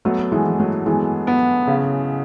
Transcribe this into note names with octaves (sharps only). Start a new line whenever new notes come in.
F#3 A3 B3
E3 G#3
E3
F#3 A3
E3 G#3 B3
B3
C#3